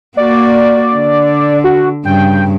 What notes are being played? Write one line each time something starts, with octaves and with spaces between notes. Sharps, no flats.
A#3 F#4 D5
D3
F#4
G2 C#3 G5